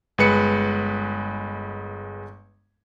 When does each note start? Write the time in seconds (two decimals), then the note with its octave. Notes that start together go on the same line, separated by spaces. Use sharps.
0.18 G1 G#3 B4 C#7